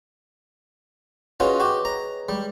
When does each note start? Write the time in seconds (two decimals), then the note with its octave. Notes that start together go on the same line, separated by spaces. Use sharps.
1.40 C#4 F4 F#4 G#4 B4 D#5
1.60 F#4 G4
1.85 C#5 A#5
2.29 G3 G#3